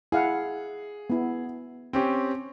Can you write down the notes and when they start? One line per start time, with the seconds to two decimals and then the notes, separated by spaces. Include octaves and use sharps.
0.12 E4 G#4 F5 F#5
1.10 B3 E4
1.93 C4 C#4 G4